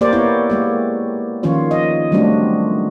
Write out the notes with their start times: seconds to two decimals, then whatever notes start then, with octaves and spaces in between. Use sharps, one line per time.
0.01 A#3 G4 A#4 C5 D5
0.12 B3 E4 C#5
0.50 G#3 A#3 G4
1.43 D#3 F3 C#4 F4 C#5
1.71 D#5
2.12 F#3 G3 A3 C4 D4 F#4